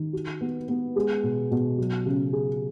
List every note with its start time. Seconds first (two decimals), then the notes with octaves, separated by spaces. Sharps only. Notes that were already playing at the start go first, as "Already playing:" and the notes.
Already playing: D#3
0.13 F#4
0.41 B3
0.69 B3
0.96 G#3
1.23 B2
1.51 B2
1.78 F#3
2.06 C#3
2.33 G#4